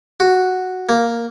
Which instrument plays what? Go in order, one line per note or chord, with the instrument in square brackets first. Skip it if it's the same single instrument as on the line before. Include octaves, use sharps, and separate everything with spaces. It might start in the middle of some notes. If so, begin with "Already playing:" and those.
[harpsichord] F#4
A#3